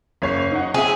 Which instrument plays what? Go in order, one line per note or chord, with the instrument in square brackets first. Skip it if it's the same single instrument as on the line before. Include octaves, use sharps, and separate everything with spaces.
[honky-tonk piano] F#1 C#5 C7
D#4 F#5
[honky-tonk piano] C4 E5 [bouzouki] G#4